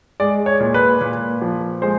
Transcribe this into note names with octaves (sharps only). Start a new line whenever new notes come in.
G#3 D5
C#5
A#2
B4
A#2
F3
G#3 C5